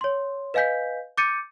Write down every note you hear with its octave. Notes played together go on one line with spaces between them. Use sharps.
C#5 C6
B4 D#5 F5 G#5 G6 B6
D6 G6 A6 C#7 D#7